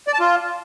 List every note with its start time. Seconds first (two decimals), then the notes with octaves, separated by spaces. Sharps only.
0.08 D5
0.14 A5
0.20 F4